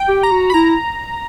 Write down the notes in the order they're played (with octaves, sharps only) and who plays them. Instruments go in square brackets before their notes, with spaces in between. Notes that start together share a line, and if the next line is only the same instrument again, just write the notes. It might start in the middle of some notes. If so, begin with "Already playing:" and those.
Already playing: [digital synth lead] G5
[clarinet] G4
[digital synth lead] A#5
[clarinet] F#4
[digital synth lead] B5
[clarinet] E4 [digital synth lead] A#5